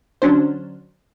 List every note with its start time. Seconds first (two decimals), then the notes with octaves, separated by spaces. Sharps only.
0.22 D3 F#3 C#4 D4 C5